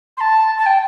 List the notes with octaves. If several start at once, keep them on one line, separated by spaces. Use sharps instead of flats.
C6
A5
A5
G5